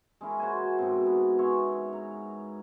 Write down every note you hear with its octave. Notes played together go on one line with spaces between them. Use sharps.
G#3 C#4 E4 A#4
F#4 C5 G#5
G#2 B2 C4
B3
C#4 C#5 E5 C6
A#5